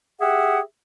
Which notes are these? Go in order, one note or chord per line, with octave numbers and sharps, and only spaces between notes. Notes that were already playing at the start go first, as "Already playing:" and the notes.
G4 G#4 E5 F#5